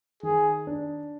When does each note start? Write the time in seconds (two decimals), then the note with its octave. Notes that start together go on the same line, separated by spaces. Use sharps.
0.23 D#3 G#4
0.67 D4